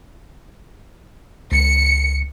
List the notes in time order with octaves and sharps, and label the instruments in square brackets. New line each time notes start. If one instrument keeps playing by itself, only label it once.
[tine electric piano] C#2 [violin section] C#7